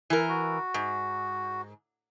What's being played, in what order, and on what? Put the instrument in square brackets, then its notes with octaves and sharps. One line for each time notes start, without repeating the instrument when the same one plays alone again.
[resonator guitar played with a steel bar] E3 A#4
[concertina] F#4
[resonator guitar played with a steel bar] G#2